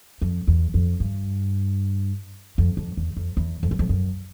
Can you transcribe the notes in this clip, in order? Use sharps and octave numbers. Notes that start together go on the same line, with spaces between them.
F2
E2
F2
G2
F2
F2
E2
F2
E2
F2
F#2
F2
F#2